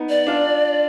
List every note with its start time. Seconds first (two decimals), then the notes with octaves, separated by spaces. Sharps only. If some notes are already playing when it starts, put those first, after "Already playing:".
Already playing: B3 D#4
0.09 D5
0.27 D4 F4